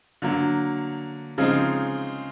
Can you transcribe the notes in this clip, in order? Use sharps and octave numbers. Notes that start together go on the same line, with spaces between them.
D3 F#3 A#3
C#3 F3 G#3 C4 D#4